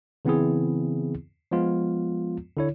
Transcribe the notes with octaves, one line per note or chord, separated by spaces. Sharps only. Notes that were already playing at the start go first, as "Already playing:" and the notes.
C#3 E3 B3 C4 E4 G#4
F3 G#3 B3 F4
D3 E4 C#5